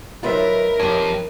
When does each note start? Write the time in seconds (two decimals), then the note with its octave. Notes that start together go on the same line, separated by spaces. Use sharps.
0.23 F3 F#3 D#4 F4 A#4 B4 E5
0.80 F2 G4 C#5